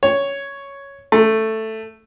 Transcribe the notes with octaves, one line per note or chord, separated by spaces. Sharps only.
C#5
A3